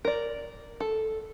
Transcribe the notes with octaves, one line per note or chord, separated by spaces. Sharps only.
A#4 D5
A4